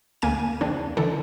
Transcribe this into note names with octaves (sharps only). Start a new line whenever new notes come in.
D2 A#3 G#5 D#7
E2 C#3 A#3 C4 D4
D3 E3 A4